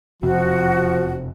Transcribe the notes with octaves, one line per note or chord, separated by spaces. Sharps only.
E1 F2 C3 F3 F#4